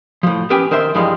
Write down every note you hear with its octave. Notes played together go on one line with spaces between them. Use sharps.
A2 F3
B3 C#4 G4 B4 G5 G#5
D#3 A#4 C5 E5 C6
G2 E3 F3 G3 G#3